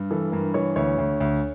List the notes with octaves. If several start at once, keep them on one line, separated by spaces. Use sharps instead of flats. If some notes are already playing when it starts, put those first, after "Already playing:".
Already playing: G2
E3 A4
G2 A#4
E3 C#5
D2 C#5
D2
D2